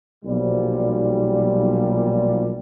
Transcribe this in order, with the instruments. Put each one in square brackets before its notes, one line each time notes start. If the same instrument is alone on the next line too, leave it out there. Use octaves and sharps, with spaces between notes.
[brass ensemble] B1 A#2 F3 G3